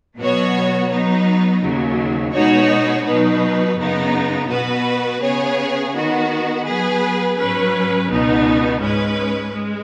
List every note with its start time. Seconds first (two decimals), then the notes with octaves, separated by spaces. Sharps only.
0.18 B2 F#3 B3 F#4 C#5
0.89 F#3 B3 D#4
1.62 D#2 C#3 F#3
2.33 B2 G#3 D#4 F#4 C#5
3.06 B2 F#3 D#4 B4
3.77 F#2 C#3 B3 D#4
4.49 B2 B3 F#4 B4
5.21 C#3 B3 G#4 C#5
5.93 D#3 B3 F#4
6.65 F#3 B3 G#4 B4
7.37 G#2 F#3 C#4 B4
8.09 C#2 B2 B3 D#4
8.81 G#2 G#3 C#4 B4
9.53 G#3